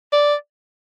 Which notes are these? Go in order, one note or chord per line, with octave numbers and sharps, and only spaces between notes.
D5